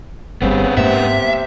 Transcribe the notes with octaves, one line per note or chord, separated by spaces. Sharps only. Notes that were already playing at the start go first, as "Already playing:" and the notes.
G1 C#3 G3 B3 C4
G#2 C3 A#3 E5